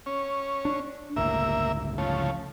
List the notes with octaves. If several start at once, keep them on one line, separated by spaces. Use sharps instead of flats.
C#4
D4
G1 C#2 A2 A#3 E5
C#3 F3 A3